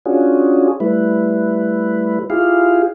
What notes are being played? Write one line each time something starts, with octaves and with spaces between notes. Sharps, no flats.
C#4 D4 F4 F#4 G#4
G3 A3 E4 B4
E4 F4 G4 G#4 F5